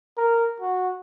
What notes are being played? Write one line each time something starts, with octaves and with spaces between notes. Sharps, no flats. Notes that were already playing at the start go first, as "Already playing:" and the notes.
A#4
F#4